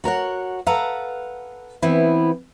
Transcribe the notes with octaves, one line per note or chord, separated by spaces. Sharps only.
F#4 A#4 C#5 F#5
A4 B4 F5 F#5 A#5
E3 B3 C4 E4